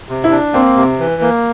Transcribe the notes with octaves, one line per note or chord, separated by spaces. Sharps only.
C3
E4
D4
A#3 C4
C3
E3
A#3